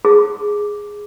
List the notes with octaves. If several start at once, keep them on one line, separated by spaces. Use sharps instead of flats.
G#4